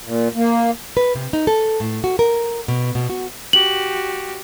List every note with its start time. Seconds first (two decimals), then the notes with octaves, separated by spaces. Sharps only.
0.03 A#2
0.35 A#3
0.97 B4
1.15 C3
1.33 D#4
1.47 A4
1.80 A2
2.04 F#4
2.19 A#4
2.68 B2
2.95 B2
3.10 F#4
3.53 F#4 G4 F#7